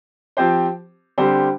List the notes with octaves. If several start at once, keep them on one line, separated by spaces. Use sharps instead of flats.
F3 C4 G4 C5
D3 G3 C4 G4 C5